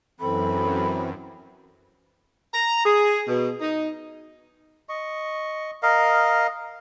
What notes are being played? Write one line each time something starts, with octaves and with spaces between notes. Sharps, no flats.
F#2 E3 C4 A4 B5
A#5
G#4
B2
D#4
D#5 C#6
A#4 D#5 F5